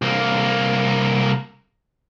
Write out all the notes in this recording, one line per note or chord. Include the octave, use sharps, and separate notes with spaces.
C2 A#3